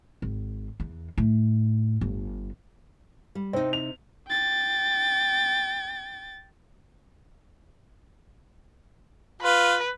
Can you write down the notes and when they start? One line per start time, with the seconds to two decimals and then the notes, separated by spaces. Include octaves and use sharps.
0.22 G#1
0.80 E2
1.18 A2
2.01 G1
3.35 G3
3.53 C3 C4 D#4
3.73 F7
4.28 G5 A6
9.42 F4 B4